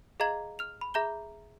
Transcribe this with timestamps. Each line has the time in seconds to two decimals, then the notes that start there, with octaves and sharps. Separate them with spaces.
0.20 G#4 D#5 F5 A#5 G#6 F#7
0.59 F6 F7
0.81 B5
0.94 G#4 E5 A#5 G6 G7